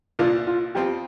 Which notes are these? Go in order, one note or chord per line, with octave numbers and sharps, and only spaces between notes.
C2 A#2 A#3 D4 F4
F4
F2 F3 C4 F4 G4